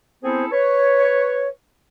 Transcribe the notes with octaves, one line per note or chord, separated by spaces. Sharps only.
B3 C4 E4 G#4 A4 C5
B4 C#5